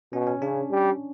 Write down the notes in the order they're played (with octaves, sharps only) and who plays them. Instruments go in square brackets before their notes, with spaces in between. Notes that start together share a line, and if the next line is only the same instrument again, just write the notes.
[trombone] B2 [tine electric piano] C#4
[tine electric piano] C#4
[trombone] C#3 [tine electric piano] D4
[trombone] G3